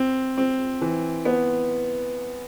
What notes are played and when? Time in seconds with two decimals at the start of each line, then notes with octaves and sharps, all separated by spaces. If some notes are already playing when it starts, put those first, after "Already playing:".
Already playing: C4
0.37 C4
0.81 E3
1.25 B3